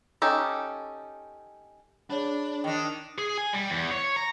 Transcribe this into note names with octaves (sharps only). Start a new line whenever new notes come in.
C#4 D#4 G4 A4
D4 G#4 C#5 B5
D#3 D4
G#4
G#5
G3
E2
C#5
A#5